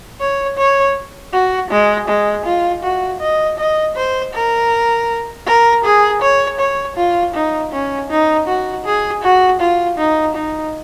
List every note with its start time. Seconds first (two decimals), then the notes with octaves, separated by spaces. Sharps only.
0.20 C#5
0.57 C#5
1.33 F#4
1.71 G#3
2.08 G#3
2.45 F4
2.83 F#4
3.20 D#5
3.58 D#5
3.96 C5
4.34 A#4
5.47 A#4
5.84 G#4
6.22 C#5
6.59 C#5
6.97 F4
7.34 D#4
7.72 C#4
8.10 D#4
8.48 F#4
8.85 G#4
9.23 F#4
9.61 F4
9.98 D#4
10.35 D#4